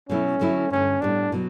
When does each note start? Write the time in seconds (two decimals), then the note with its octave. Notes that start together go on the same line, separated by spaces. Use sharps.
0.09 B2 F#3 A3 C#4 E4
0.40 D3 F#3 A3 E4
0.70 G2 D3 A3 C#4
1.01 A2 G3 B3 D4
1.32 B2 F#3